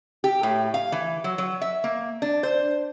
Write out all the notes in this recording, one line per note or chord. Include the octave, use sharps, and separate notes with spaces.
G4
A2
F5
E3
F#3
F#3
E5
A#3
D4
C5